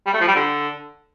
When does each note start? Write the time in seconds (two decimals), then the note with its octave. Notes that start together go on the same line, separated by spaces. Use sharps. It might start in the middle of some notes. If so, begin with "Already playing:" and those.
0.06 G3
0.13 A3
0.21 F3
0.28 G3
0.35 D3